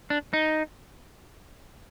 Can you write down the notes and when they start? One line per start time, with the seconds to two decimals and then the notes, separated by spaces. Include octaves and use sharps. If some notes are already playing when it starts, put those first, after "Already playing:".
0.10 D4
0.33 D#4